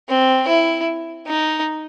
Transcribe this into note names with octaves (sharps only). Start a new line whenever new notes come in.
C4
E4
D#4